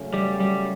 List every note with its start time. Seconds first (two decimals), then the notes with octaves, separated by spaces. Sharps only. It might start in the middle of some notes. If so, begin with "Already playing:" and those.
Already playing: C#3 F#3 A3 C#4
0.14 G3
0.40 G3